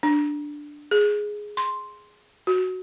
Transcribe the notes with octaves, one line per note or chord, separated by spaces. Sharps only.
D4
G#4
C6
F#4